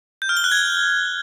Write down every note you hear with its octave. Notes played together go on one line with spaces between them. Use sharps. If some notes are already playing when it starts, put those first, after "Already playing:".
G6
F6
G7
F#6
G#6